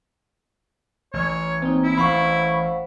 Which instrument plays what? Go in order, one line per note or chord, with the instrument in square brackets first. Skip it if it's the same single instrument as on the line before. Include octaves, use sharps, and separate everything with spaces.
[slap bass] A1 [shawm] C#5
[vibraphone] A#3 D#4 [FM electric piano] C4
[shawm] E4
[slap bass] A1 [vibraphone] C5 F5 F#5 [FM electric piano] B5 C#6